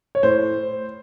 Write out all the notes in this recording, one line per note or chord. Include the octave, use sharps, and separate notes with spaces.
C#5
A2 C5